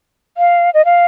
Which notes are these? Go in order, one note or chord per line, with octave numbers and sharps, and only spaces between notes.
F5
D#5
F5